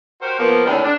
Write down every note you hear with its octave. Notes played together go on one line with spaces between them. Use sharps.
F#4 G4 A#4 C5
F3 A#3 B3
D#2 A2 D3 C4 C#4 D5
D4